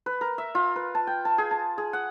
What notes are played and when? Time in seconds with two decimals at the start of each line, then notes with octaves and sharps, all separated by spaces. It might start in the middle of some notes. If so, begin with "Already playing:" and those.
0.06 B4
0.21 A#4
0.38 E5
0.55 F4
0.76 B4
0.95 A5
1.07 G5
1.25 A5
1.38 G#4
1.51 A5
1.78 G#4
1.93 F#5